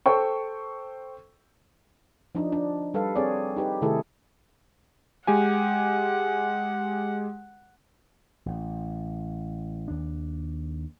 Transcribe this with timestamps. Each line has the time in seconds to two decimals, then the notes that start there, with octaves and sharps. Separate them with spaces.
0.06 A4 C5 G5 C#6
2.35 F3 D4 D#4
2.52 D4
2.94 G3 A4 B4 F5
3.16 C4 G#4 C#5 D5
3.56 D#4 G4 B4
3.82 C3 D#3 A3 E4 G#4 A4
5.27 G#3 G4 F#5 G#5
8.46 A1
9.88 D#2 D4